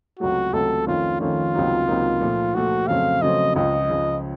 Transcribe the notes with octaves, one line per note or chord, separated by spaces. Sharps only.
C#2 C3 F#3 A3 F#4
C#2 C3 F#3 A3 A4
F2 D#3 A3 C#4 F4
F2 D#3 A3 C#4 F4
C#2 C3 F#3 A#3 D#4
C#2 C3 F#3 A#3 D#4
A#2 F3 A3
A#2 F3 A3 F#4
F2 C#3 F#3 A3 C4 F5
F2 C#3 F#3 A3 C4 D#5
C#2 C#3 F3 D#5
C#2 C#3 F3